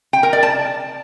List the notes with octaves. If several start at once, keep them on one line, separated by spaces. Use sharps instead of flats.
G5
A#4
D5
A5